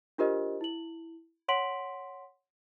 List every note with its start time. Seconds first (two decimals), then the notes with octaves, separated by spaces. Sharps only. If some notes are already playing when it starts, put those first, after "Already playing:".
0.18 D4 F4 G4 A#4 C5 D#5
0.61 E4 F#7
1.48 C#5 F#5 C6 B6 D7 F#7